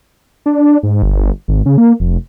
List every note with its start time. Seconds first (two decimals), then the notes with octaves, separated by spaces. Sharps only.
0.46 D4
0.83 G#2
1.03 G1
1.48 G#1
1.66 C#3
1.78 A#3
2.00 F1